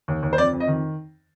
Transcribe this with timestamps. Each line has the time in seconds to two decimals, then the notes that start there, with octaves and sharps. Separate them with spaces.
0.08 D#2
0.23 D#2
0.33 C5
0.38 F2 D5
0.53 F2
0.60 D#5
0.67 D#3